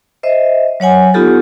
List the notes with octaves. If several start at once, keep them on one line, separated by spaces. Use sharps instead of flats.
C5 D#5 E5
F#3 C#5 F#5 G#5
B3 D#4 F4 G4 A4